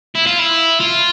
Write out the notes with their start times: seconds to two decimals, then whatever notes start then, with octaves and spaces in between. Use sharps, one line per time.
0.15 E4
0.26 F4
0.39 E4
0.80 F4